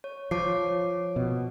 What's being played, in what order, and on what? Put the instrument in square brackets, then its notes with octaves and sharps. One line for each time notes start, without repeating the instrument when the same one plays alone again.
[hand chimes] C#5
[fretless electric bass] F3 [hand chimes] C#5 D6 C7
[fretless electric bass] B2